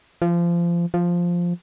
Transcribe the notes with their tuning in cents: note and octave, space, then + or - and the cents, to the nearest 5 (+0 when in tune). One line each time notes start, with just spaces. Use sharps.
F3 -25
F3 +0